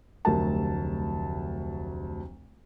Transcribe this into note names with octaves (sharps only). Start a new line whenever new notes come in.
F1 D2 F#3 G4 A#4 A5